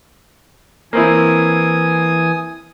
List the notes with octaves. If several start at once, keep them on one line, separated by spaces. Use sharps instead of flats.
E3 A#3 C4 E4 G#5 D#6